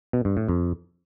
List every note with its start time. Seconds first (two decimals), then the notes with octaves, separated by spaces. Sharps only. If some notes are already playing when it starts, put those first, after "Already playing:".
0.13 B2
0.25 G2
0.37 A2
0.48 F2